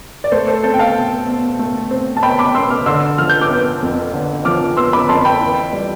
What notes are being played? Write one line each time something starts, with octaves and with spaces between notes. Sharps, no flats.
D5
A3 A4 C5
A4 C5
C4 A4 C5
G5
F5 A5
B2
B2
A3
C4
A5
B2 G5 B5
B5 D6
B2 C6 E6
D6 F6
D3 C6 E6
F3 F6
G6
D6 F6
B3
F2
D3
F3 D6 F6
B3 C6 E6
B5 D6
F2 A5 C6
G5 B5
E3
G3